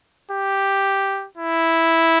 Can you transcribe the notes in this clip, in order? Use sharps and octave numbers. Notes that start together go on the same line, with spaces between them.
G4
E4